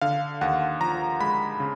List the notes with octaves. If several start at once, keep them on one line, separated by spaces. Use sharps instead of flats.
D3 F5
D#2 F#5
F3 A#5
G#3 B5
C#3